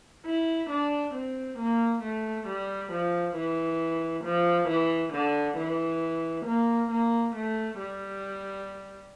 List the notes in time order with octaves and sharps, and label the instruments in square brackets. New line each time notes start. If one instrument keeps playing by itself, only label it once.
[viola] E4
D4
C4
A#3
A3
G3
F3
E3
F3
E3
D3
E3
A#3
A#3
A3
G3